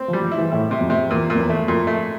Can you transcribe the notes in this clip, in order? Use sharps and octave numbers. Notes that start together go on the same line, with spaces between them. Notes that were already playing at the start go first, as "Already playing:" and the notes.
Already playing: C4
F3
G3
F3
E4
E3
A2 E4
C3
F2
C3
E2 A#2
A#2
F2
E2
A3
F2 A#2
A3